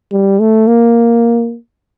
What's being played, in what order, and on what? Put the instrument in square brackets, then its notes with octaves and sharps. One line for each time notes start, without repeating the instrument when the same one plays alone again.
[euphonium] G3
A3
A#3